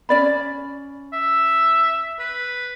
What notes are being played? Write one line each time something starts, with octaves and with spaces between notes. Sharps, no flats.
C#4 D5 B5
E5
B4